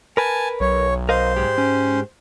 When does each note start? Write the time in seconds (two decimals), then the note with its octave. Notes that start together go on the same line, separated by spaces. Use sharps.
0.17 A#4 B4 G#5 A5
0.60 B1 C#5
1.09 A#4 C5 D#5 F5
1.36 G#2 G#3 G4
1.58 C#4